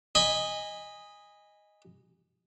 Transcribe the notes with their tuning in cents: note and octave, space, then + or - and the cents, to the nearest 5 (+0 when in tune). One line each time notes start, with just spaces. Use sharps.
D#5 +0 G#5 -15 B5 +0